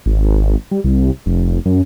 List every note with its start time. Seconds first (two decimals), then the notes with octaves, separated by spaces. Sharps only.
0.06 G#1
0.71 G3
0.84 C2
1.26 F1
1.66 F#2